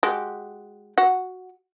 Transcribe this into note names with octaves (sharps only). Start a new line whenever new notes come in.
G#3 F#4 G4
F#4 F#5